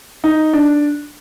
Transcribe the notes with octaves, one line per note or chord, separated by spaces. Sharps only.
D#4
D4